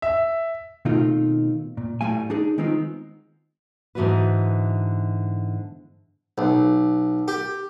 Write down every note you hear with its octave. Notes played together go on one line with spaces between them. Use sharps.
E5
B2 D#3 A3 C4 D#4 F4
A#2
A2 G3 A3 F5 G#5
D4 D#4 G#4
D#3 G#3 B3 C4 D#4 F4
G#2 D3 E3 B3 F#4 B4
B1
G4